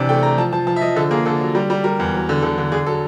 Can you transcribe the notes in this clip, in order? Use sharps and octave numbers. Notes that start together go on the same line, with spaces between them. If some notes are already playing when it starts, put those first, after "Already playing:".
Already playing: C3 E3 D4
A3 G5
A3 A#5
F3 A5
F3 A5
F3 A5
E5
F3 D#5
D3 A4
A#3 G#4
D3 A4
F#3
G3
G3
G3 A#4
E2
F#3
D3
D3 A4
D3
D3 G#4
F#3 A4